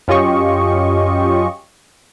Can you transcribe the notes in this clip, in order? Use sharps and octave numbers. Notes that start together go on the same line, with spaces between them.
F#2 C#4 F4 G4 D#5 C#6